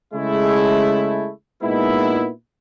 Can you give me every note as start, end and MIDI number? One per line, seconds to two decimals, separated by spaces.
0.14 1.31 49
0.14 1.31 56
0.14 1.31 57
0.14 1.31 64
1.63 2.29 46
1.63 2.29 56
1.63 2.29 59
1.63 2.29 63
1.63 2.29 64